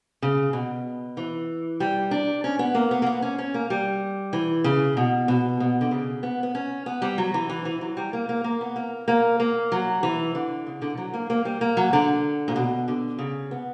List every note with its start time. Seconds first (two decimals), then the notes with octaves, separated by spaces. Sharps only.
0.22 C#3
0.53 B2
1.17 E3
1.80 G3
2.11 D4
2.44 C#4
2.59 B3
2.75 A#3
2.91 B3
3.02 A#3
3.06 B3
3.22 C#4
3.39 C#4
3.54 A#3
3.70 G3
4.33 E3
4.64 C#3
4.97 B2
5.28 B2
5.60 B2
5.81 D3
5.91 C#3
6.23 B3
6.43 B3
6.55 C#4
6.86 B3
7.02 G3
7.18 F#3
7.34 E3
7.49 E3
7.65 E3
7.81 F#3
7.97 G3
8.13 A#3
8.29 A#3
8.44 A#3
8.61 B3
8.76 A#3
9.08 A#3
9.40 A#3
9.72 F#3
10.03 E3
10.35 D3
10.67 C#3
10.82 D3
10.98 F#3
11.14 A#3
11.30 A#3
11.45 G3
11.61 A#3
11.77 F#3
11.93 D3
12.48 A#2
12.56 B2
12.88 D3
13.19 C#3
13.51 B3